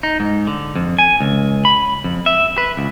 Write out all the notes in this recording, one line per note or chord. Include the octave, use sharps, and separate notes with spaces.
D#4
G#2
D3
F2
G#5
C#2
B5
F2
E5
B4
C#2